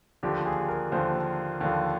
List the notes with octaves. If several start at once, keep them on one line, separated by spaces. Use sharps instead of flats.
D#2 D3 F3 G4
G#4
A#4
D#2 D3 F3 C5
D#2 D3 F3